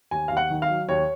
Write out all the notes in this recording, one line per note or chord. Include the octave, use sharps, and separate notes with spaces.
D#2 G#5
D#2 F5
F#5
D#3
F5
F#3
D#2 C#5